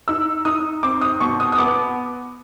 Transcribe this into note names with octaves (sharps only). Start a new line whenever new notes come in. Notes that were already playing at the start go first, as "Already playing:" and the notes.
D#4 E6
D#4 D#6
C4 D6
D#6
B2 C#6
D#6
D#6
B3 D6